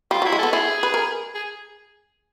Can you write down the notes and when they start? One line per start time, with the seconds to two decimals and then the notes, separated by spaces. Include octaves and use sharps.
0.11 G3 F4
0.22 F#3
0.25 E4
0.32 G#3
0.39 B3 A4
0.52 E4 G#4
0.83 B4
0.94 A#4
1.35 G#4